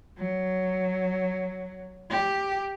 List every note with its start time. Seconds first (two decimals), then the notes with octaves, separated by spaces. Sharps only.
0.18 F#3
2.10 G4